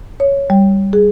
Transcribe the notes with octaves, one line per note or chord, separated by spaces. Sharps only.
C#5
G3
G#4